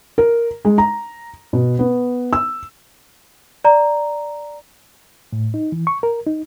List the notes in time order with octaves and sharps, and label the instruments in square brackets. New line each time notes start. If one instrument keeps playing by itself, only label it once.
[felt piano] A#4
G#3
A#5
B2
B3
E6
[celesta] D5 A#5
[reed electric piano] A2
D#4
E3
C#6
A#4
D#4